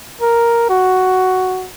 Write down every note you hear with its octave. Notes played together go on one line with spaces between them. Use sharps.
A#4
F#4